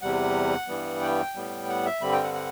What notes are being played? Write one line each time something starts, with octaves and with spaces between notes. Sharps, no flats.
E2 C3 G3 F#5
G2 E3 G3 B3
G5
A2 G3 B3
F#5
E5
G2 D3 G3 C4 B5
G5
F#5
F#5